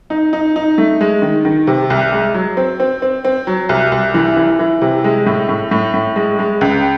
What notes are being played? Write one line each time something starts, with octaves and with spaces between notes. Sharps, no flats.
D#4
D#4
D#4
A3
G#3
D#3
D#3
C3
C2
G#3
F#3
C4
C4
C4
C4
F#3
C2
C2
E3
E3
E3
C3
G#3
A2
A2
A2
A2
G#3
G#3
C#2